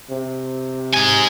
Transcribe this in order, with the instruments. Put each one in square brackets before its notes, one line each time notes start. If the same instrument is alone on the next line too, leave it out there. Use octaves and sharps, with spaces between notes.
[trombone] C3
[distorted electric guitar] D#4 G#5